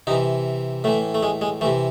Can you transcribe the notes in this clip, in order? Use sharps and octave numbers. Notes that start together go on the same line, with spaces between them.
C3 E3 D#4
A2 E3 A3
A3
G#3
G#3
C3 E3 A3